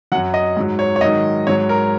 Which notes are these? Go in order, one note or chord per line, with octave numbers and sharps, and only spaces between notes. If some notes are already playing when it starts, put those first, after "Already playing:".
F#2 F#3 F#5
D#5
G#2 F#3
C#5
C#5
G#2 D#3 F#3 D#5
G#2 F#3 C#5
A#4